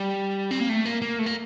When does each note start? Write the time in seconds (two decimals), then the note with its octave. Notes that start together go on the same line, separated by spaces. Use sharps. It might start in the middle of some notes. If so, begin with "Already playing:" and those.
Already playing: G3
0.51 C4
0.60 A#3
0.69 A3
0.85 A#3
1.02 A#3
1.19 A3
1.26 A#3